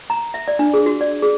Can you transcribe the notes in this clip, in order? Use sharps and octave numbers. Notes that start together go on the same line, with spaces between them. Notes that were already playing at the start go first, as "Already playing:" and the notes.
A#5
E5
D5
D4
G#4
F#4
D5
G#4